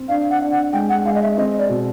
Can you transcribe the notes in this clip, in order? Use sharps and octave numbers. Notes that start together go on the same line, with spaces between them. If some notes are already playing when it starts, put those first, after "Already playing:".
Already playing: C4
D4 F5
F#5
D4
F#5
G#3 G5
F#5
G#3 F5
D#5
E5
C4 D#5
D5
B2